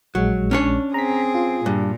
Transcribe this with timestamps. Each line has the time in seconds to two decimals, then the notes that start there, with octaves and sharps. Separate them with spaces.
0.15 A#1 F#3 G#3
0.51 C#4 D4 C#5
0.94 C4 G#4 A#5 B6
1.35 F4
1.66 G2 A#2